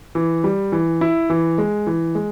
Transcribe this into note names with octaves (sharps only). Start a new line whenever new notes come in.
E3
G3
E3
E4
E3
G#3
E3
G#3